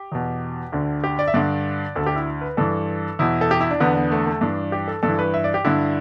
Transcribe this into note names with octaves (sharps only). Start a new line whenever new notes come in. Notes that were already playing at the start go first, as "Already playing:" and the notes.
Already playing: G4
E2 B2
D2 D3
G4
D5
E5
G2 D3 D5
D2 D3 A4
G4
E4
B4
G2 E3 A4
E2 B2 E4
A4
G4
E4
D4
E2 D3 B3
B3
A3
A3
G2 E3 D4
G4
A4
G2 A4
E3
B4
E5
D5
G4
G2 D3 E4